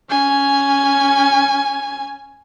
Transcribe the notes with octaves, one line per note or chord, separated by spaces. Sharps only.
C#4 G#5